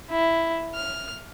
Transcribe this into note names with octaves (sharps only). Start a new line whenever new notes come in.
E4
F6